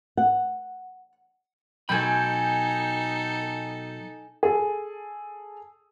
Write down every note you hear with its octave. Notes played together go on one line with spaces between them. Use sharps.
F#5
B2 F#3 D#4 A4 G5 G#5 B5
G#4 A4